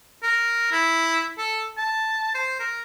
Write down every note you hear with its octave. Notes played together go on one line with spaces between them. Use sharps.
A#4
E4
A4
A5
C5
A#4